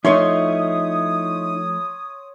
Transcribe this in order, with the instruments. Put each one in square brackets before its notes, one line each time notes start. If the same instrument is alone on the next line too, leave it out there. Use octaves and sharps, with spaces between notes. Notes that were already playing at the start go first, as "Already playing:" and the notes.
[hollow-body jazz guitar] F3 A3 [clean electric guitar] D#4 E4 [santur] C#5 C6 C#6 [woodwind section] D#6